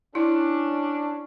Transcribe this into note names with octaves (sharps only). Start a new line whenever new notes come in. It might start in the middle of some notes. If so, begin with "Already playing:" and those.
C#4 D4 E4